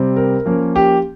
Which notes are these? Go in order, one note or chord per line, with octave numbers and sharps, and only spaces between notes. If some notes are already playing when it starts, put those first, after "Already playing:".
Already playing: C3 G3 C4
A#4
F3 A#3 C#4
G4